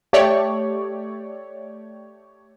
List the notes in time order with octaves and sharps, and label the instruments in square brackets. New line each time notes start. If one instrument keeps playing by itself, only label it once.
[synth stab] A3 G4 C#5 D5